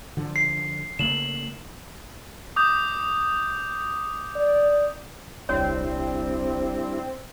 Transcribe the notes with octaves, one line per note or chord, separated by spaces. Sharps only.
D3 F3
C7
C#3 A3 A#3 E7 F#7
D6 D#6 G6
D5
D#1 C2 G3 C4 D4 E4 C#5